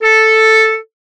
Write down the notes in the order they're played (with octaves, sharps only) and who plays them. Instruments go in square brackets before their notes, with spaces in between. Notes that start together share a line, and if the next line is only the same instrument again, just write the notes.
[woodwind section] A4